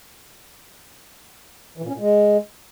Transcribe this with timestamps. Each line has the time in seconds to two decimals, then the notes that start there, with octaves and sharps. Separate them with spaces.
1.78 E3
1.83 A#2
1.89 C#4
1.94 A#2
2.00 G#3